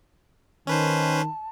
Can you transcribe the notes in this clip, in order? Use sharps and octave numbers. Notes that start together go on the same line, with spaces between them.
D#3 C#4 B4 C5 A5